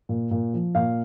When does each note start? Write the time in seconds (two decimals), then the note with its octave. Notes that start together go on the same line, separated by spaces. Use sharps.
0.09 A#2
0.31 A#2
0.54 F3
0.75 A#2 F5